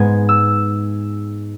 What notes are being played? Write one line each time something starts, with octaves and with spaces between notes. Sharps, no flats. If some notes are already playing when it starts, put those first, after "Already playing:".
Already playing: G#2 G#3 B3 G#6
E6